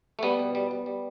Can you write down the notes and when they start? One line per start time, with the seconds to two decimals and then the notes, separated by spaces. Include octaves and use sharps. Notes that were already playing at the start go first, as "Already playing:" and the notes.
0.19 A3
0.23 G3 B3
0.39 B2
0.55 G3
0.71 G3
0.86 G3